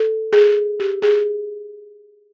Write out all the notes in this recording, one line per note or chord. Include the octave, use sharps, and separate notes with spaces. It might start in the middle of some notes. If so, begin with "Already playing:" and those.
Already playing: A4
G#4
G4
G#4